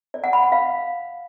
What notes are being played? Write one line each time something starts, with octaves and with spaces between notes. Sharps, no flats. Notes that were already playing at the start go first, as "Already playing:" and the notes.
D5
F#5
B5
F#5
F5